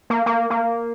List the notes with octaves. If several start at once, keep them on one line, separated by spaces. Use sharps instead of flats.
A#3
A#3
A#3